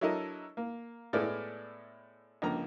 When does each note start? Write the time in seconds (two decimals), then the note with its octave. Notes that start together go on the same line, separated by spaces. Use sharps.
0.01 F#3 D4 E4 A4 A#4 D#5
0.57 A#3
1.13 A2 G#3 B3 E4 D5 F6
2.42 C#2 D3 F3 A#3 A#5